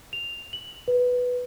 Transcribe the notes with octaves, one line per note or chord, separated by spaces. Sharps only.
F7
F#7
B4